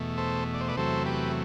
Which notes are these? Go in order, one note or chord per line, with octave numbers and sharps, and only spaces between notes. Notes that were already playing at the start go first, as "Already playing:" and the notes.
Already playing: E2 B2 A3
A4 C5
D5
C5
B4 D5
E2 C3 F#3 A3 A4 C5
G4 B4